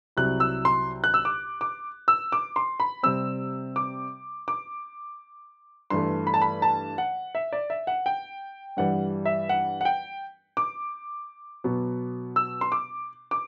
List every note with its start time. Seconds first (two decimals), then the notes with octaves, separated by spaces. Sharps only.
0.17 C2 C3 F#3 F#6
0.40 E6
0.65 C6
1.04 F#6
1.14 E6
1.25 D6
1.61 D6
2.08 E6
2.32 D6
2.56 C6
2.80 B5
3.03 C3 G3 C4 E6
3.76 D6
4.48 D6
5.90 G2 E3 A3 C6
6.27 B5
6.34 A5
6.42 B5
6.62 A5
6.98 F#5
7.35 E5
7.53 D5
7.70 E5
7.87 F#5
8.06 G5
8.77 G2 E3 G3 F#5
9.26 E5
9.49 F#5
9.81 F#5
9.85 G5
10.57 D6
11.64 B2 F#3 B3
12.36 E6
12.61 C6
12.72 D6
13.31 D6